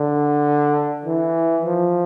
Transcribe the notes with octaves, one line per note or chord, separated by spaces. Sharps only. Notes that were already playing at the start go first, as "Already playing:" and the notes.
Already playing: D3
E3
F3